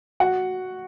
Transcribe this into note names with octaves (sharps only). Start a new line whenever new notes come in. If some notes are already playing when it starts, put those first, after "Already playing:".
F#4 F#5